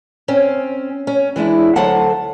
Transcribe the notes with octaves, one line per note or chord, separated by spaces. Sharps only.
C4 C#4
C#4
E3 G#3 D4 E4
D2 F#3 A4 C5 F#5 A5